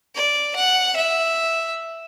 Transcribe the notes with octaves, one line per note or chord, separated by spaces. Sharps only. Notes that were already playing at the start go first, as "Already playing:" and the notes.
D5
F#5
E5